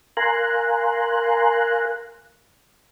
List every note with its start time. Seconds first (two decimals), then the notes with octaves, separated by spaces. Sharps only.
0.17 A#4 F5 G#5 A#5 C6 F#6